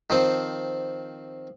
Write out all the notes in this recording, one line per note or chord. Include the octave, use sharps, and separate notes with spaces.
D#3 F3 C4